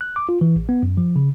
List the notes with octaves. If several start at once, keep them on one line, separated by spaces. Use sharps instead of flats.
F#6
D6
F4
E3
A1
B3
F#2
F3
C#3